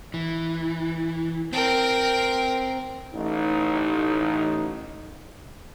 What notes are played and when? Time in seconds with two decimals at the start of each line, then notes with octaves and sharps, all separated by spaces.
0.14 E3
1.53 C4 A#4 G5
3.14 A1 D#4